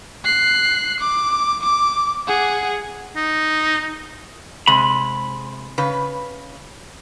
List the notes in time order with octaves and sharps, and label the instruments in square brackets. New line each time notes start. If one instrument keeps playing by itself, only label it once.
[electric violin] F#6 C7
D6
D6
G#4 F#5
[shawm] D#4
[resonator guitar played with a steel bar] C3 G#3 [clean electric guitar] B5
[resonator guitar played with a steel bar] C#3 B4